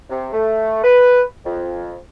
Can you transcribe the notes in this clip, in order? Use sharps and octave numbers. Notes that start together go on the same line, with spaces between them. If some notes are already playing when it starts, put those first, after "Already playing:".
C3
A3
B4
F2